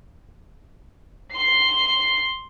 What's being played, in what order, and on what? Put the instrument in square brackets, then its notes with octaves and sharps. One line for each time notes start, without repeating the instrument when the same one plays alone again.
[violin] C6 C7